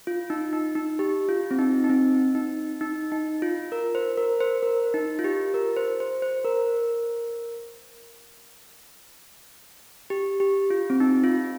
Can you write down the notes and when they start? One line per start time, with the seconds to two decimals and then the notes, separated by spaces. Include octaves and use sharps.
0.07 F4
0.30 D#4
0.53 D#4
0.75 D#4
0.99 G4
1.29 F4
1.51 C4
1.59 D#4
1.84 D#4
1.90 C4
2.35 D#4
2.81 D#4
3.12 D#4
3.42 F4
3.72 A#4
3.95 C5
4.18 A#4
4.40 C5
4.63 A#4
4.94 D#4
5.19 F4
5.24 G4
5.54 A#4
5.76 C5
6.00 C5
6.22 C5
6.45 A#4
10.10 G4
10.40 G4
10.70 F4
10.90 C4
11.00 D#4
11.24 F4